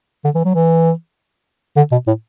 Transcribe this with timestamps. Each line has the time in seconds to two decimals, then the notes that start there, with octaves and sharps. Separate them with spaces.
0.25 D3
0.35 E3
0.45 F#3
0.55 E3
1.77 D3
1.92 B2
2.07 A2